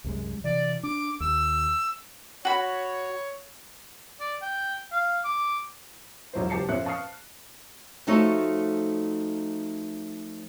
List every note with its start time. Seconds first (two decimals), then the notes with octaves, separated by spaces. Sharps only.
0.04 C2 F#2 G#3
0.44 C3 E3 D5
0.83 D4 D6
1.20 D#2 E6
2.45 F#4 C#5 B5
4.20 D5
4.42 G5
4.92 F5
5.25 D6
6.33 E1 A#1 F#3 E4 C5
6.50 F#1 G4 A5 C7 C#7
6.69 F2 A#2 C#4 E5 F#6 C#7
6.85 F5 A5 C#6 D#6 F6 C7
8.07 F3 A3 D#4 F#4 A4 C#5